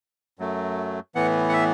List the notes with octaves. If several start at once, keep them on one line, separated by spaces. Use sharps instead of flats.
F#2 F#3 A3
A2 E3 B3 F#5
F#5
E5